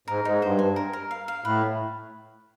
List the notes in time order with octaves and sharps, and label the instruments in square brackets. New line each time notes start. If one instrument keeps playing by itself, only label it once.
[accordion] G#2 [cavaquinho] A#4
[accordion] G#2 [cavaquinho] D#4
[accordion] G2 [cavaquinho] C5
[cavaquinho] G#5
A#4
A#4
F5
F5
[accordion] A2 [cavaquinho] B4